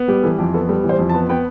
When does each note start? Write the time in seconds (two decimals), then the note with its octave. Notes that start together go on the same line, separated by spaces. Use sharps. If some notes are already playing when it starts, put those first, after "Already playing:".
Already playing: B3
0.08 G3 G4
0.23 E3 A4
0.38 F2 G4
0.54 B3 A4
0.69 G3 A4
0.84 E3
0.89 C5
0.99 F2
1.09 A5
1.14 B3
1.29 B3 G5